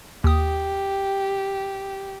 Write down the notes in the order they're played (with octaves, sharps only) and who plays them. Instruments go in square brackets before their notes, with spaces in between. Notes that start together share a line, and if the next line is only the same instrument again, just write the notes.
[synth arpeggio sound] D#2 D#6 [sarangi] G4